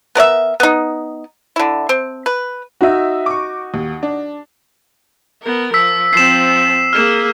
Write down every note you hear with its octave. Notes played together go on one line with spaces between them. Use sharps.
B3 A#4 D5 E5
B3 D#4
D3 E4
C4
B4
D#4 F#4 D#5 E5
C#6 D6
D#2
D4
B3 A#4
F3 E6 B6
F3 C4 C7 E7
A#3 G#4 F6 E7